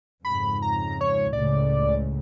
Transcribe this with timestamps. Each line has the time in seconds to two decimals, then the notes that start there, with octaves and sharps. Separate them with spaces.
0.25 F2 G#2 C#3 B5
0.62 A#5
1.01 C#5
1.33 C#2 A2 C#3 D5